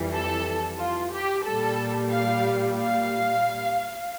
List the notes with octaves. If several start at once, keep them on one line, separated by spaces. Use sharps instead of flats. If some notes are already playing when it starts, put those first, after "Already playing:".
Already playing: F2 E3 G3
A4
F4
G4
A#2 G3 A4
F5
F5